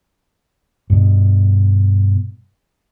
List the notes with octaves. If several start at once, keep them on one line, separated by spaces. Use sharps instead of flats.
G2 B2